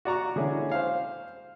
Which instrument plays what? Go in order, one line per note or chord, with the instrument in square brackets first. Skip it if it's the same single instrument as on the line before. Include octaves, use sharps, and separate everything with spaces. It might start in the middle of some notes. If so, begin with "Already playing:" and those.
[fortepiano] F#4 D5 A#5 C#6
D3 G#3 C#4 E4 G#4
C5 F5